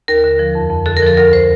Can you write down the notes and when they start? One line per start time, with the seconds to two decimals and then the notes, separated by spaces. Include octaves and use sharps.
0.08 D#2 A#4
0.24 D3
0.39 F3
0.55 F2
0.70 F2
0.86 D3 A4
0.97 A#4
1.02 F3 A4
1.17 D2 A#4
1.33 C5